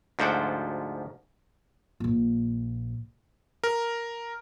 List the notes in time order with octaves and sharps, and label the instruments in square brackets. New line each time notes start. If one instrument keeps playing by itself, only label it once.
[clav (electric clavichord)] D2 G#2 F3 C5 F#5 G5
[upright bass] A#1 A#2
[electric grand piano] A#4